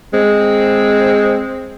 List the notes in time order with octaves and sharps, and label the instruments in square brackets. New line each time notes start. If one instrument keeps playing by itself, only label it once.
[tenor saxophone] G#3 [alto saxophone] C4